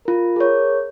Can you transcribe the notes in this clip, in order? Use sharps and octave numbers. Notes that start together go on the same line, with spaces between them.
F4 A#4
G#4 A#4 C#5